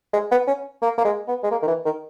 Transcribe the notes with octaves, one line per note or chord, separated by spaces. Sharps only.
G#3
B3
C#4
A#3
A#3
G#3
B3
G#3
A#3
D#3
E3
D#3